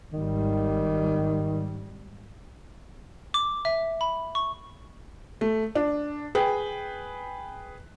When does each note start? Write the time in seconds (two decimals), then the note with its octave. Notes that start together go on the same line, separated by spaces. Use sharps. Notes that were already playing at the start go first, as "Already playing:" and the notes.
0.13 G#1 D#3 G3
3.34 D6
3.65 E5
4.01 B5
4.35 C#6
5.41 A3
5.75 D4
6.35 G#4 B4 G5